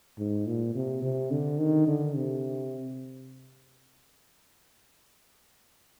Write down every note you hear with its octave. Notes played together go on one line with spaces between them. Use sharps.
G#2
A#2
C3
C3
D3
D#3
D3
C3